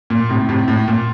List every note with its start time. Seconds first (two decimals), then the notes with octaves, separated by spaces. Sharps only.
0.10 A#2
0.29 A2 C3
0.49 A2 C3
0.68 A2
0.88 A#2